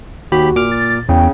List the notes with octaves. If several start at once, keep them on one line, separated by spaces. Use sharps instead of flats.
D#2 F#4 G4 B5
A#2 D6 F6
A6
E2 C#3 G5